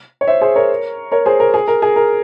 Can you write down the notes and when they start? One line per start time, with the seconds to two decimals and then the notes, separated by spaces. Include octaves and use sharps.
0.21 C#5
0.28 C5 E5
0.41 G#4 C5
0.56 A#4 C#5
1.12 A#4 C#5
1.26 G#4 C5
1.40 A#4
1.54 G#4
1.68 A#4
1.82 G#4
1.96 A#4